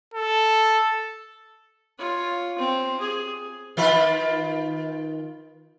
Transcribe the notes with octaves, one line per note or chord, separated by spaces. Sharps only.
A4
F4 C#5
C4
G#4
D#3 F4 B4